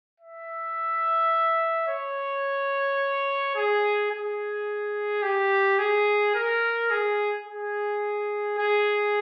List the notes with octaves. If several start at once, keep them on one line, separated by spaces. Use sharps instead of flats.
E5
C#5
G#4
G#4
G4
G#4
A#4
G#4
G#4
G#4